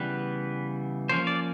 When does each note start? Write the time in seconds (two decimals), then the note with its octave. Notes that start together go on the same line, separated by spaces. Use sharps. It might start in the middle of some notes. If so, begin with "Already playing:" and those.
Already playing: C#3 E3 G3 B3 B4
1.09 F3 A#3 C#4 C5
1.27 D5